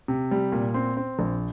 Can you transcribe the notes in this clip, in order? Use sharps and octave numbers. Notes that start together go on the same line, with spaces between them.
C3
G3
A#2
C4
C4
A#1